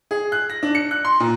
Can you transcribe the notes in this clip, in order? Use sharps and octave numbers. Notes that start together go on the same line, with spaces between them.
G#4
F#6
A#6
D4
C#7
F#6
C6
A#2